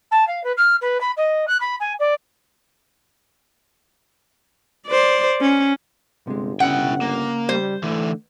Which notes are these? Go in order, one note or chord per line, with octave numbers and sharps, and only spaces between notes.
A5
F5
B4
F6
B4
B5
D#5
F#6
B5
G#5
D5
C5 D5
C#4
G1 C3 G#3
C#3 C#4 E4 F#5 G5
A#3
G3 C5
D3 E3 A3